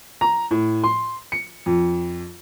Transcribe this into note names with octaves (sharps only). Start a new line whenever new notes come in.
A#5
A2
C6
C#7
F2